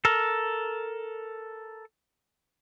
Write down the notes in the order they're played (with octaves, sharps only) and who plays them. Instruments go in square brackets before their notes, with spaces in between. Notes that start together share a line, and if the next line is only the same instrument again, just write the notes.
[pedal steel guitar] A4 A#4